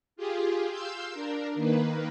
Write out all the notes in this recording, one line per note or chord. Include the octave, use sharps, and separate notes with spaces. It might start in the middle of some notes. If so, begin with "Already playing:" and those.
F4 G4 G#4
F5 C6 E6 G6
D4 A#4
D#3 A#3 B4